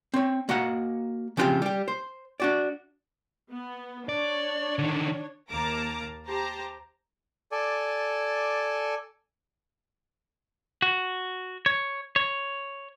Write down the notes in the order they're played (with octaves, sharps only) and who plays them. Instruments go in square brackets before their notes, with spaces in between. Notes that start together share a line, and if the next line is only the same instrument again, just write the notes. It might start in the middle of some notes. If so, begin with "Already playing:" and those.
[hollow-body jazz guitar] C4 C#5
A#3 F#4 D#5 F#5
C#3 F3 B3 C4 F4 G4
G3 G4
C5
D4 F#4 D5
[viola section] B3
[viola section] D4 C#5 [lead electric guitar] D5
[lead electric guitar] D3 D#3
[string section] D#2 A#3 A5 A#5 D6
G4 C5 A5 A#5
[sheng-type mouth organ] A4 D5 G#5
[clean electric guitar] F#4
C#5
C#5